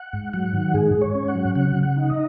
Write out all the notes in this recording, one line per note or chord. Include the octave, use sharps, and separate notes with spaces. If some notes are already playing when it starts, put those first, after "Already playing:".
Already playing: F#5
G#2
F#3 F#5
D#3
G#2 G#4
G#2
C#5
C#4
F#5
F#3
C#3 F#5
C#3
F#5
D#4
D#5